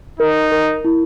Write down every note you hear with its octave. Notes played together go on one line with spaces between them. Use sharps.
D#4 A#4
A#4
E4